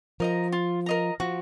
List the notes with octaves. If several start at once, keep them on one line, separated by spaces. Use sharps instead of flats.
F3 A#4 D#5 A#5
F4
A#4 D#5 A#5
F3 F#4